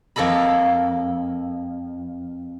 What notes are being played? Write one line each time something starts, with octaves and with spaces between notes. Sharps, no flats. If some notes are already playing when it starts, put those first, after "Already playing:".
F2 A#3 A4 D#5 B5